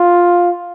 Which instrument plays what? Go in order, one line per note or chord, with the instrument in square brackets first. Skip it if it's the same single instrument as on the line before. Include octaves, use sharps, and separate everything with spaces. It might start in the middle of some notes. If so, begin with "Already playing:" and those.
Already playing: [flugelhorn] F4